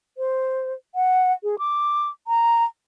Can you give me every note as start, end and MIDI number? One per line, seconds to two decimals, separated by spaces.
0.18 0.73 72
0.95 1.32 78
1.43 1.56 68
1.59 2.09 86
2.27 2.64 82